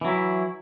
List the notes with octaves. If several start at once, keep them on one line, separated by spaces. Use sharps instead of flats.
E3 F#3 E4